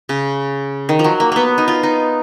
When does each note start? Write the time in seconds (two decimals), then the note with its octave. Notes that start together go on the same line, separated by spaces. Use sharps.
0.09 C#3
0.89 D#3
0.99 F3
1.04 F#3
1.20 A#3
1.32 A#3 B3
1.58 D#4
1.68 F4
1.83 D#4